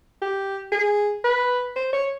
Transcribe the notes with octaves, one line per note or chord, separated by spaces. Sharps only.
G4
G#4
B4
C5
C#5